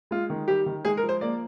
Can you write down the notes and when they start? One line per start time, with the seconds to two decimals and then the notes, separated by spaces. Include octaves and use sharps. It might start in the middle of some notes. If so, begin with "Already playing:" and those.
0.11 G#3 F4
0.30 D#3
0.48 G3 G4
0.66 D#3
0.85 G#3 G#4
0.97 A#4
1.03 F3
1.09 C5
1.21 A#3 D5